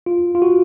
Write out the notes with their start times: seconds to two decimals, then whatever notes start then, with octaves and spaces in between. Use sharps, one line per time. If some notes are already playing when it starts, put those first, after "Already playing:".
0.06 F4
0.35 F4
0.42 F#4